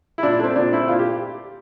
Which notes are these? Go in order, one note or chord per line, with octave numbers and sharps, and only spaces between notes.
E4
A#2 D4
A3 C4 D4
A#2 D4
A3 C4 E4
A#2 F4
G4